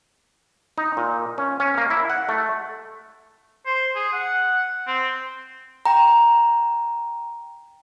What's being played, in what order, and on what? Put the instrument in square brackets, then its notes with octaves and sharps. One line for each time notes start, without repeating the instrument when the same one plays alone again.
[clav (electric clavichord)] D#4
A#2
C#4
C#4
A#3
E4
F#5
A3
[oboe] C5
G#4
F#5
C4
[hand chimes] G5 A#5